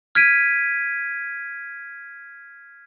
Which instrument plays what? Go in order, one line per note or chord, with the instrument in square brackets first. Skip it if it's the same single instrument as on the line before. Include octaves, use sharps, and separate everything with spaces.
[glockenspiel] F6 G#6 B6 D7 D#7